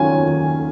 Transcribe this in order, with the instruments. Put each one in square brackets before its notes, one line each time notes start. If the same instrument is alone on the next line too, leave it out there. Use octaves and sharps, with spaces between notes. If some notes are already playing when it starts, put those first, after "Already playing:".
Already playing: [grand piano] D#2 D#3 F#3 C#4 F4 [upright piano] G#5
[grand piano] D#2